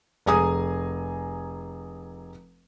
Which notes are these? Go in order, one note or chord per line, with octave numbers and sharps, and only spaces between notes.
F1 G#4 G#5 A#5 D#6